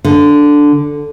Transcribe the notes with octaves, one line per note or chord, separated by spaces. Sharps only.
D3